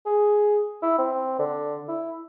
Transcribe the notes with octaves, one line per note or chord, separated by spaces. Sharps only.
G#4
E4
C4
D3
E4